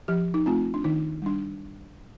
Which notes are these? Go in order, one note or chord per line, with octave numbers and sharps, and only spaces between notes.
F3 G4
D#4
A3 C4 F4
D4
D#3 D#4
G3 D4